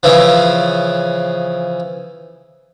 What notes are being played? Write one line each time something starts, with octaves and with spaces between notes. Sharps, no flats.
C#3 E3 F3